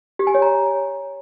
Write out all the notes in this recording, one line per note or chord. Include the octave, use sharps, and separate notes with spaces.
G4
G#5
C#5
A#5